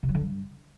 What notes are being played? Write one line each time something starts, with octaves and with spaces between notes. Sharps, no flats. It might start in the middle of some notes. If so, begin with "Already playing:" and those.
C3
F#3
D3
G2